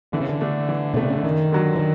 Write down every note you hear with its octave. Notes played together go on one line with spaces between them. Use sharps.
D3 E3
C#3
D3
A3 D4
E3
B2
C3 A3 D4
C#3
D3
F#2 D#3
D3 F#3
E3
D#3